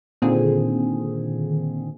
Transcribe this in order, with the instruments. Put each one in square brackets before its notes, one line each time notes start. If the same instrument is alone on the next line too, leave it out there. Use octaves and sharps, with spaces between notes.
[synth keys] A#2 D3 D#3 C4 G#4